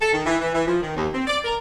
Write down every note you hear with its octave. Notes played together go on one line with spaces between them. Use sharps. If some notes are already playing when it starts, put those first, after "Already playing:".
A4
D#3
E3
E3
E3
F3
D#3
D#2
C4
D5
A#4